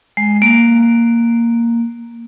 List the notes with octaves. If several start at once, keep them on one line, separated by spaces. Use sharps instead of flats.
G#3
A#3